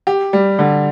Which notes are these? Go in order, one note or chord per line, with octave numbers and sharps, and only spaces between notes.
G4
G3
D3